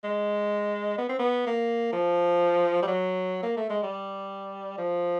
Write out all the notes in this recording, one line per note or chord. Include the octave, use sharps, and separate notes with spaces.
G#3
B3
C4
B3
A#3
F3
G3
F#3
A#3
A3
G#3
G3
F3